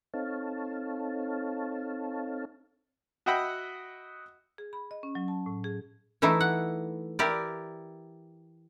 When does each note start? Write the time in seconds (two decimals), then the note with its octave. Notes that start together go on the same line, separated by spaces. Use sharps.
0.14 C4 D#4 A4 C#5 F5 A5
3.26 F#4 D#5 E5 F#5 G5 B5
4.58 G#4
4.73 B5
4.91 D#5
5.03 C#4
5.15 F#3
5.28 A5
5.46 A2
5.64 G#4
6.22 E3 A3 D#4 E4
6.40 F#5
7.19 E4 G4 A#4 D5